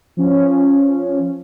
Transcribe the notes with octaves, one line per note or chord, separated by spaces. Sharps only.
F3 C#4